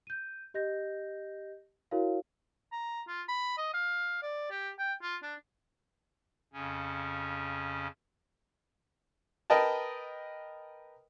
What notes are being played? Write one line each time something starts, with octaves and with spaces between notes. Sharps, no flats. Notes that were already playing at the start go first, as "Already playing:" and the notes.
G6 D#7
G4 D#5 G6 A#6
E4 F#4 A#4 C#5 F5
A#5
F4
B5
D#5
F5
D5
G4
G5
F4
D4
F2 C#3 C#4
A#4 B4 D#5 G5 A5